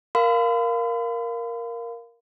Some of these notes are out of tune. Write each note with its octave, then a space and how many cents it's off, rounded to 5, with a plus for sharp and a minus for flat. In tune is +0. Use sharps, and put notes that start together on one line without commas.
A#4 +0 F5 +0 B5 +45